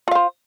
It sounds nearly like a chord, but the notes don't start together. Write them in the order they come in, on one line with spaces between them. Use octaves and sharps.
F4 F5 C5